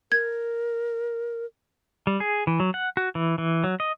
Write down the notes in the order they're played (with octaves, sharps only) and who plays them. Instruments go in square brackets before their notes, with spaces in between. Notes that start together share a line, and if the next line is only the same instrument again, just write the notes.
[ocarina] A#4 [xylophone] G#6
[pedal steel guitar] G3
G#4
E3
F#3
F#5
F#4
E3
E3
F#3
D#5